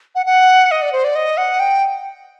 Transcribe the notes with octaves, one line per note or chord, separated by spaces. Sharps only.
F#5
F#5
D#5
D5
C5
D5
D#5
F#5
G5